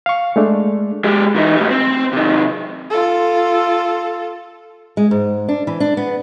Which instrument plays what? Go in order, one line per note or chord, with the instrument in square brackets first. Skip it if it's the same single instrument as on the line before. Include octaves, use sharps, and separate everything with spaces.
[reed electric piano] F5 C#6
G#3 A3 D4
[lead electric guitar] G#3 G4
E3 D#4
A2 G3
C4
C3 D#3
[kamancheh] F4 A4
[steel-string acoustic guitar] G#3
G#2
D4
E3
D4
B3